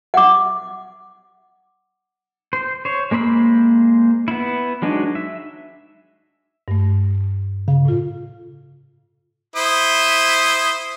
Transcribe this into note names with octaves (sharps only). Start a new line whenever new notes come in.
F#5 D6
C5
C5 C#5
G#3 A#3 C5 B5 E6
B3 E4
F#3 G#3 D4 D#4 F#4
E5
G2 A3
C#3 F5
A2 F4
E4 C5 D#6